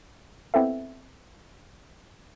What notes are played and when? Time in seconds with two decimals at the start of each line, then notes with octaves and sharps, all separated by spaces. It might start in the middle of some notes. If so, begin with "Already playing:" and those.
0.54 B3 C4 E4 A4 E5